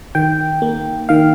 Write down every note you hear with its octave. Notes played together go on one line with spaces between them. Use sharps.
D#3 G5
A#3
D#3 F5